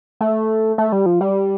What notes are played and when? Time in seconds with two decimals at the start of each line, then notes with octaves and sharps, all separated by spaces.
0.21 A3
0.78 A3
0.92 G3
1.06 F3
1.21 G3